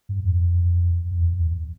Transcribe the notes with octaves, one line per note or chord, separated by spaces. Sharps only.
G2
F2
F2
E2
F2
E2